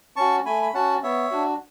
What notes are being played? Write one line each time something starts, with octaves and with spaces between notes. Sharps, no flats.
C#4 F#4 A5 C#6
A3 G#5 B5
B5
C#4 F#4 F#5 A5
B3 C#5 E5
D4 F#4